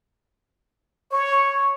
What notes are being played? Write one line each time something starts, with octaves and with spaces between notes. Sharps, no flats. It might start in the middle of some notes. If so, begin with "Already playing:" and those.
C#5 C#6